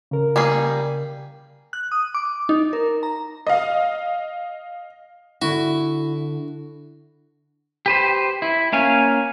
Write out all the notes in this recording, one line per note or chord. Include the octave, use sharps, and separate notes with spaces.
C#3 A#4
G3 A#3 G#4
F#6
D#6
D6
D#4
A#4
A#5
D#5 F5
D3 E4 F#4
G4 B4 C5
E4
A#3 C#4 F5 G#5